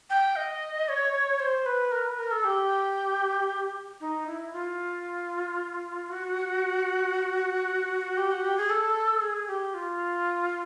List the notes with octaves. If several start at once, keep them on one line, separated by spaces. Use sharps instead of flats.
G5
D#5
C#5
C5
B4
A#4
B4
A#4
A4
G4
D#4
E4
F4
F#4
G4
F#4
G4
G#4
A4
G#4
G4
F4